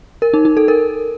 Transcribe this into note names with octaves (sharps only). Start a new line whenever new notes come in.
A#4
D#4
D#4
A4
A#4